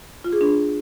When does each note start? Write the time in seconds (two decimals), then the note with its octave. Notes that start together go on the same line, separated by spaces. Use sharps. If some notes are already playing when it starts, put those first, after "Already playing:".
0.24 F4
0.33 G#4
0.41 D4